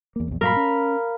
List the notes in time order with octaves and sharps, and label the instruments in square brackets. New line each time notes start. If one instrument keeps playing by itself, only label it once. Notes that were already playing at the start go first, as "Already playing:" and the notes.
[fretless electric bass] E2 A#3
A#1 E2
[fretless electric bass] G2 A#2 F#3 [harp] A#4 F5 B5
[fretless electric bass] C#4